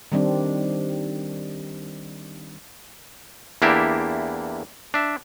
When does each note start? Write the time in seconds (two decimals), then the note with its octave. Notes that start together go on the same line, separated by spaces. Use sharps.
0.12 D#3 G3 C4 D4
3.62 E2 A#3 D4 E4 G4 E5
4.94 D4 E5